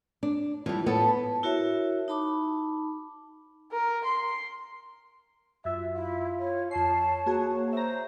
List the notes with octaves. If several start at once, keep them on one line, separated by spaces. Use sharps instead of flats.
D4
E3 F3 G3
A2 B3 A4 A5
E4 F#4 A#4 C#5 E5
D#4 A5 B5 D6
A#4
C6
F#2 F4 E5
E4 F4
C#5
F2 C#5 A5 C7
A#3 F#4 G#4
C5 E5 A#5